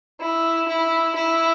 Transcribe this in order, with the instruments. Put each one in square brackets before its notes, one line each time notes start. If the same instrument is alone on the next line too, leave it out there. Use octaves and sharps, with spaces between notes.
[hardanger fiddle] E4
E4
E4